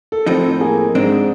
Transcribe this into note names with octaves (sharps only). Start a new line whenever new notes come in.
A4
A2 F3 C4 D#4 A4
A#3 G#4
G#2 G#3 C4 D4